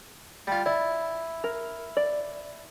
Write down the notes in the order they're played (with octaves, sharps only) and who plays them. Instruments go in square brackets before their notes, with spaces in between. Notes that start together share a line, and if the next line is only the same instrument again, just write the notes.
[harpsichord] G3 F4
[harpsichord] E4 [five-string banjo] D5
[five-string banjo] A#4
D5